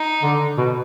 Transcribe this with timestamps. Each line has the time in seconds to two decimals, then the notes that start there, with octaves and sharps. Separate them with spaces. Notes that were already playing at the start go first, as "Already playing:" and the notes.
Already playing: D#4
0.23 D3
0.58 B2